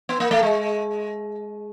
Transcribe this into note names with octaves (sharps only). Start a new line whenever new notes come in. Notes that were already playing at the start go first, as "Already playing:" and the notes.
B3
A#3
A3
G#3